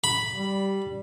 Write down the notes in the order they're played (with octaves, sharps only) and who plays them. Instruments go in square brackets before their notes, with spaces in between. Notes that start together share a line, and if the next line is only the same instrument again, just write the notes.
[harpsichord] B5
[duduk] G3